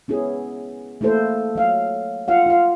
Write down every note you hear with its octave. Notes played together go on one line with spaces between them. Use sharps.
B3 C#4 E4 G#4
A3 A#3 E4 A4 C5
F#3 F5
F4 F5 F#5
F4 F5